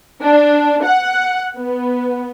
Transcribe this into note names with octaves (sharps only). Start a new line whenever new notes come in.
D4
F#5
B3